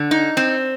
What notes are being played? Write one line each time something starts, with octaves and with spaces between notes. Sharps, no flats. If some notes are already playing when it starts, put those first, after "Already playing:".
Already playing: D3
D#4
C4